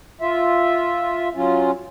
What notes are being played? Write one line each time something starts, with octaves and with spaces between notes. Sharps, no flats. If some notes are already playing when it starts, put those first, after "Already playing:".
F4 E5
F#3 C#4 F4